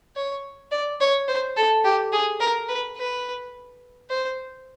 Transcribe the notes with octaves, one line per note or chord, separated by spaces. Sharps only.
C#5
D5
C#5
C5
A4
G4
G#4
A#4
B4
B4
C5